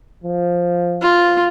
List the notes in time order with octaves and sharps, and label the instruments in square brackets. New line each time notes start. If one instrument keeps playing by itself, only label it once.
[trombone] F3
[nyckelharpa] F4